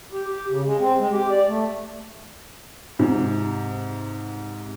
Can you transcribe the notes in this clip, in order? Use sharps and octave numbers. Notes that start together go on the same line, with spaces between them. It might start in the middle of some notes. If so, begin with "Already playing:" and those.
G4
G4
C#3
G#3
C4
G#3
G4
D5
A3
G#2 C3